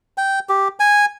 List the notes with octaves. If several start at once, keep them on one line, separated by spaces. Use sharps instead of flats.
G5
G4
G#5